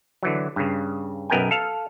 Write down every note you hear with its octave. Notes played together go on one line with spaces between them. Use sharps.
D3 E3 F#3
G2 C#3
B1 F#2 B3 A#4 G5 G#5
A4 F5